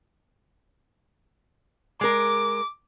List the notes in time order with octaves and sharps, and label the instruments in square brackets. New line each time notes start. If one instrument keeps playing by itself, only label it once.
[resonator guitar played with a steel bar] G#3 A#4 [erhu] D6